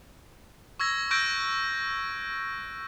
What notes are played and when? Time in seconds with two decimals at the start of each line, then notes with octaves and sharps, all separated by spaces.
0.80 C#6 E6 G#6 A#6
1.11 C#6 E6 F#6 G6 A#6 D7